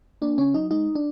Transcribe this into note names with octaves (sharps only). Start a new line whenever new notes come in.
A#3 D4
C#3 C#4
F#3 D#4
G#3 D#4
D4